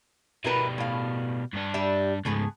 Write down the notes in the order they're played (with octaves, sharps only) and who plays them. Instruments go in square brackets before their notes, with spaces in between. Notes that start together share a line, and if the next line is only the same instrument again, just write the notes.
[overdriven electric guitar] B2 G3 [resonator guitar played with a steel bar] E4 A#4 B4
[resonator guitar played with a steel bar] A2 F5
[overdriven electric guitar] G2 D4
[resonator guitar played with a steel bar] G3 G4 E5
[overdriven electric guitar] C#2 G#2 [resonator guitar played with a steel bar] A3 B3 G#4